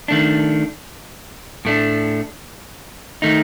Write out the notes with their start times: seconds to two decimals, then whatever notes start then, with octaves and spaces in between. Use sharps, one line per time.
0.08 D#3 A3 D4
1.65 A2 A3 D4
3.22 D#3 A3 D#4